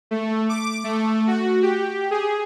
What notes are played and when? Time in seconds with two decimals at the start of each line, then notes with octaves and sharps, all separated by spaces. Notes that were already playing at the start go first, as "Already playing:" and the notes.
0.11 A3
0.49 D6
0.84 A3
1.27 F#4
1.62 G4
2.11 G#4